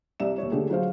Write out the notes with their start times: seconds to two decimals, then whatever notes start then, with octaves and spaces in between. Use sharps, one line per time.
0.20 C2 C3 D5 E5 E7
0.38 D#2 C#5
0.52 D3 A3 G4 G#4
0.70 F#3 F4 G#4 C5 F5